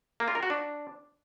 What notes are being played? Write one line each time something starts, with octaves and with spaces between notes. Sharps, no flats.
A#3
F4
A#4
F#4
D4